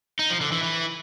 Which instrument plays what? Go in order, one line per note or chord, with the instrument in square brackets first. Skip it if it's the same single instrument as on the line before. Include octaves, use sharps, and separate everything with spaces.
[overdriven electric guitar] D#4
F3
D3
E3
E3